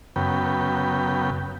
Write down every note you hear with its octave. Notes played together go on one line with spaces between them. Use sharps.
F#2 C#3 B3 G5